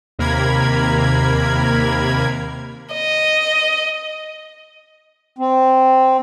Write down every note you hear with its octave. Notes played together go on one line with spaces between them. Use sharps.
D#2 C3 A#3 A#4 B5 G#6
D#5
C4